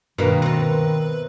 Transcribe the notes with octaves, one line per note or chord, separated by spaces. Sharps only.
G2 B2 D#3 A#3 A#4 B4
C3 C4 B4